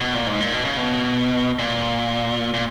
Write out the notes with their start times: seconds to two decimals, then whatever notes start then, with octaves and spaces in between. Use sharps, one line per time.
0.01 B2
0.14 A#2
0.27 G#2
0.40 A#2
0.53 B2
0.65 C#3
0.77 B2
1.59 A#2
2.54 A#2